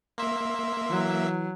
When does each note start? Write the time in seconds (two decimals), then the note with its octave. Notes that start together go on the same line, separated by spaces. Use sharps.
0.18 A#3 E5 C6
0.90 E3 F#3